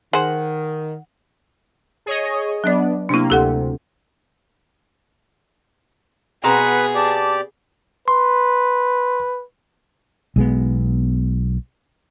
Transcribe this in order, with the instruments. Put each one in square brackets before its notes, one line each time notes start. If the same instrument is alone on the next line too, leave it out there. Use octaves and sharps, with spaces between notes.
[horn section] D#3 [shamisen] G#4 C5 [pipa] F#5
[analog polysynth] G#4 C#5 D#5
[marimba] F#3 D5 [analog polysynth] B3 D4
[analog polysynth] C3 A#3 [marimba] D4 E4
[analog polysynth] D2 C3 [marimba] G4 A4 F#5
[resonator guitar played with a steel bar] B2 C4 A#5 [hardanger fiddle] B3 G#4 [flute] B4 [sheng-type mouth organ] F#5
[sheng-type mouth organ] G4 D5 [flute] A5
[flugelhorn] B4 [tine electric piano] C6
[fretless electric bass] B1 G#3 B3